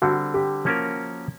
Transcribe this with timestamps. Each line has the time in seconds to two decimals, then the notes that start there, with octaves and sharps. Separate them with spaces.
0.02 D3 G3 C4 F#4
0.34 G4
0.65 F3 A#3 C#4 F#4 A#4